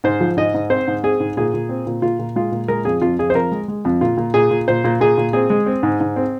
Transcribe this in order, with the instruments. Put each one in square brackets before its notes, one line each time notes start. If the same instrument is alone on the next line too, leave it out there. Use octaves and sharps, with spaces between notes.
[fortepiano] G#2 C5
F3
G#2 D#5
G#2
C4 C5
G#2
C4 G#4
G#2
A#2 G#4
A#2
C4
A#2
A#2 F4
A#2
G#3 F4
A#2
G#3 A#4
F2 G#4
F2 F4
F2 G#4
C5
F2 A#4
G#3
G#3
F2
A#2 F4
A#2
A#2 G#4
A#2
A#2 C5
A#2
A#2 G#4
A#2
C4 G#4
G#3
C4
G#2
G#2
C4